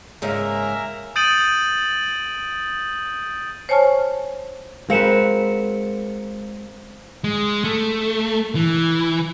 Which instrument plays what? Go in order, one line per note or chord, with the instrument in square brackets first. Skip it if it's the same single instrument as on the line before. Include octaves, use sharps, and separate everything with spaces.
[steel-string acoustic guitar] G#2 C#3 G#3 [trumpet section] A#3 A#4 E5
[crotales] D#6 G6 A6 D7 D#7 F#7
[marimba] C5 C#5 G#5 A5 C#6 F6
[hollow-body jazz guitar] G#3 [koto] C4 B4 [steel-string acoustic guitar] F#4 A#4 [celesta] F5 C#7 E7
[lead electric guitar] G#3
A3
E3